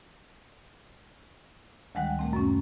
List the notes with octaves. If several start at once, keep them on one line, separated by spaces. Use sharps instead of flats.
D2 D#3 G3 G#3 F#5 F#6
A#2 A3 C4
F#2 B3 C#4